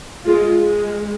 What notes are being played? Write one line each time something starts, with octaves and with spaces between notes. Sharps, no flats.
G#3 F4
G#3